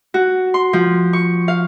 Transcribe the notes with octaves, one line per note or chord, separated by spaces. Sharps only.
F#4
C6
F3
C#6
F5